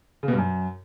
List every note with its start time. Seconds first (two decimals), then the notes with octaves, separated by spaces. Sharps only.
0.23 C#3
0.28 B2
0.33 G2
0.38 F#2